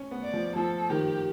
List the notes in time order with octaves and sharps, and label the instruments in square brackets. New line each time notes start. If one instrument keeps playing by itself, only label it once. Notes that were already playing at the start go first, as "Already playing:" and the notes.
Already playing: [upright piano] C#4
B3
[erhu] D5
[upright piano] F3
[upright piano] F3 [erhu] A4
[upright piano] D#3 [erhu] G4